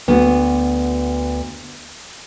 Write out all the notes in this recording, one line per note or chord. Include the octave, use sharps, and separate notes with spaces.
D2 B3